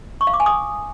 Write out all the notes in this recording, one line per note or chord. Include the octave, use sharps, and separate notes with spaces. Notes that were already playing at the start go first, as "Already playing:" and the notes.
C#6
F5
D6
G#5
D#6